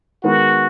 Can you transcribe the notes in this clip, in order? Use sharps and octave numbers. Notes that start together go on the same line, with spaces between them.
D#3 G#3 B3 D#4 F#4 A#4